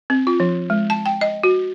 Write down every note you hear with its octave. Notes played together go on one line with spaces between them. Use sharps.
C4
F4
F3
G#3
A5
G5
D#5
F#4